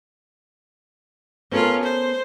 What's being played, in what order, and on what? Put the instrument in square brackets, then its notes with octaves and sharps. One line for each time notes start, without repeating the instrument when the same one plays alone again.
[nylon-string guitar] B3 A4 A#4 [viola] C#4 F4
[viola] C5